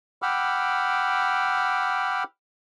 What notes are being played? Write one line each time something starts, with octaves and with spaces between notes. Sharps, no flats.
F#5 G5 B5 D6 E6 F6